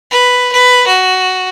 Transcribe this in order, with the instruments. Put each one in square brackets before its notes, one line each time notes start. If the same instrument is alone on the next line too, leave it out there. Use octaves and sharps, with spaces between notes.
[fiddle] B4
B4
F#4